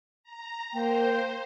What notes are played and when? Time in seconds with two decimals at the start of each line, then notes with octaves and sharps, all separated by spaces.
0.23 A#5
0.73 A#3 C5 G5